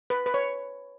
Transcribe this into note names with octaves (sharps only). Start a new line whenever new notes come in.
B4
B4
C#5